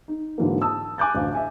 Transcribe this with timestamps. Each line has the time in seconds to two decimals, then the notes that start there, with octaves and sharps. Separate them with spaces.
0.08 D#4
0.38 G#2 D3 E3 F#3 A#3
0.62 A5 D#6 E6
0.98 G#5 D6 F#6 G6 A6
1.15 A1 D2 F5
1.35 E5 G#5